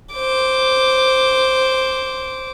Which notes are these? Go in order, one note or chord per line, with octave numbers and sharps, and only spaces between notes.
C5 D6